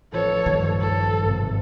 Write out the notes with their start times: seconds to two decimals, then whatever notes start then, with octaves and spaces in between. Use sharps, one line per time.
0.13 A1 F3 A4 B4 C#5
0.46 G2 A#2 D#3
0.81 A4
1.22 G#1 C3